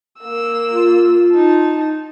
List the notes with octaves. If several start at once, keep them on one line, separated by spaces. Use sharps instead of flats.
A#3 E6
F4
D#4 A5